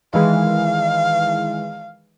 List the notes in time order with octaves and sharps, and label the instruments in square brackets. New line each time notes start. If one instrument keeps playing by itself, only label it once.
[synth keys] D#3 E3 G#3 [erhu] F5